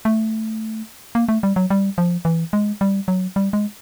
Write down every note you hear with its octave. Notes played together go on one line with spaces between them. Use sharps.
A3
A#3
A3
G3
F#3
G3
F3
E3
G#3
G3
F#3
G3
G#3